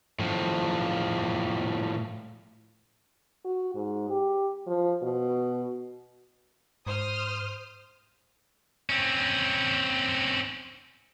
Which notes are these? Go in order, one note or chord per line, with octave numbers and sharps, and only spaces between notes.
A2 F3
F#4
G#2
G4
F3
B2
G#2 C5 D#6 F6
C4 C#4